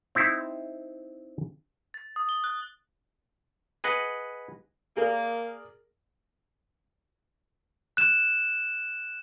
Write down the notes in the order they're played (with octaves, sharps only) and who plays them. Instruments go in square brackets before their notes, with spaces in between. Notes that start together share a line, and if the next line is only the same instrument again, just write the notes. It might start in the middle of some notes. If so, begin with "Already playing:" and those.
[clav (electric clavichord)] C4 D#4 E4
[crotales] A6
D#6
G7
F#6
[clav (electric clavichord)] G#4 B4 D#5 F#5
[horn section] A#3 [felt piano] G#4 A#4 D5
[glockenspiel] F#6 E7